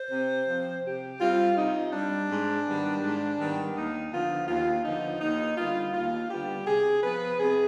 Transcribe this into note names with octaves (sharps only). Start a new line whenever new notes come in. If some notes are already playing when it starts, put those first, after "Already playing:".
Already playing: C5
C3
F3 C4
C3 G4
G3 C4 F4
C3 D#4
G3 C4 D4
G#2
D#3 G3 B3
G#2
D#3 G3 B3
D#2 D#4
D3 F3 B3 F4
D#2 F4
D3 F3 B3 D#4
D#2 D#4
D3 G3 B3 F4
D#2 F4
D3 G3 B3 G4
C3 G#4
F3 B3 B4
C3 G#4